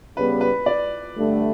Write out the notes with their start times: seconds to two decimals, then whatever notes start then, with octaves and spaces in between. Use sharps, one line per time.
0.16 C#3 G3 B3 B4
0.41 B4
0.66 D5
1.16 G2 D3 A3